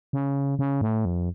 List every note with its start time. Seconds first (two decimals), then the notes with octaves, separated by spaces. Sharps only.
0.13 C#3
0.59 C#3
0.81 A2
1.05 F2